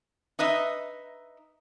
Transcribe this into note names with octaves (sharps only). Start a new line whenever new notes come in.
D#4 B4 D#5 E5